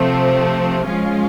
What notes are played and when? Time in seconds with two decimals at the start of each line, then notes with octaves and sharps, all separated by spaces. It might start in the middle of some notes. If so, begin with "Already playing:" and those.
Already playing: C3 F3 A3 C4
0.87 F3 G#3 C#4 F4